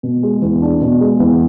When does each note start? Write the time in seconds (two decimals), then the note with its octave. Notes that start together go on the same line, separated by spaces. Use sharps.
0.03 B2
0.23 G#3
0.42 E2
0.62 D4
0.81 B2
1.00 G#3
1.20 E2